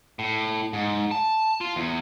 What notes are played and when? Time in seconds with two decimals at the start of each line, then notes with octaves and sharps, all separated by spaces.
0.19 A2
0.73 G#2
1.11 A5
1.61 F4
1.76 E2